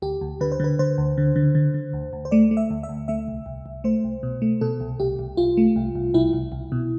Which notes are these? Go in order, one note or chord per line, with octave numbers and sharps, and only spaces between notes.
D2 G4
D2
D3 B4
C5
D3 B4
D3 C5
D2
D3
D3
D3
D3
D2
D2
C5
A3 D5
A3
E5
D2
E5
D2
A3 E5
C2
C2
C2
A3 C5
C2
B2
A3
B2 A4
C2
C2 G4
C2
C2 F4
A3
C2
C2
C2 E4
C2
C2
B2